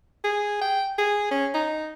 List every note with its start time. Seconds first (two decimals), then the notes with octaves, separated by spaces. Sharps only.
0.24 G#4
0.61 G5
0.98 G#4
1.31 C#4
1.54 D#4